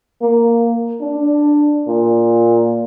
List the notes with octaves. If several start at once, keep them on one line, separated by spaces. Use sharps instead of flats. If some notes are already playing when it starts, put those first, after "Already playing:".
A#3
D4
A#2